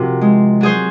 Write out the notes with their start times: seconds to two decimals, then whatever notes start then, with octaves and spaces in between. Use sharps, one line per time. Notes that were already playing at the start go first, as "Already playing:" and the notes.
Already playing: C3 F3 F#4 A#4
0.21 G#3
0.61 F#3 G#4 C5